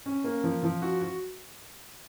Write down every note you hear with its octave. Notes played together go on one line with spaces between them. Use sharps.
C#4
A#3
F3
F3
F#4
F#4